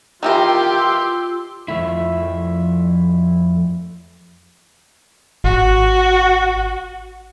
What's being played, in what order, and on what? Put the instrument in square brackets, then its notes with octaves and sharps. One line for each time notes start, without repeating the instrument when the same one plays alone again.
[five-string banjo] D#3 E3 A#4 [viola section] F4 [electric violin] G4 C6 [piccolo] E6
[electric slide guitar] F2 F3 A3 E4
[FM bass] G#1 [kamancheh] F#4